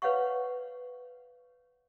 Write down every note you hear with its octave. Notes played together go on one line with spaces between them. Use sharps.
B4 C#5 F5 F#5 C#6